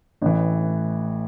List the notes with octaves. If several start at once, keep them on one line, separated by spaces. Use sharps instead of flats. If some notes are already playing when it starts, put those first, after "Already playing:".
A1 A2 E3